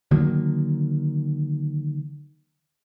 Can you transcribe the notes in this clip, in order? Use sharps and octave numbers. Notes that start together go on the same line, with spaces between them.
D3 D#3 F#3 A#3